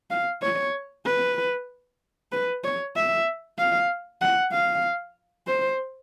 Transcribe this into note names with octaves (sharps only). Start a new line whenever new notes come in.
F5
C#5
B4
B4
C#5
E5
F5
F#5
F5
C5